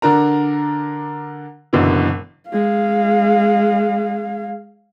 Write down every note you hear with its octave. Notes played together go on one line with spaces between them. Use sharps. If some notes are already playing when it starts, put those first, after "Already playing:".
D3 D4 A#4 A#5
F#1 F#2 B2 D3 E3
G#3 F5